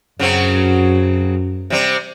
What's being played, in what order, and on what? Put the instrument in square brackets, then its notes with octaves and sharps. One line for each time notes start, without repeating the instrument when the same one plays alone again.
[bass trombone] F#2 [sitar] C#3 F#3 C4
[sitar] C3 G3 C4